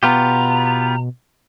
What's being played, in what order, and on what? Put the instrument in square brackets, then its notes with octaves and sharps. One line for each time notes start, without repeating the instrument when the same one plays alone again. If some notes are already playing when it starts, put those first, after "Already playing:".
[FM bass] B2 [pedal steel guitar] B3 F4 G4 [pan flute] A#5